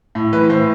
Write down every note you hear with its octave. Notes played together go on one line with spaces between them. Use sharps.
A2
E3 B4
A2 C5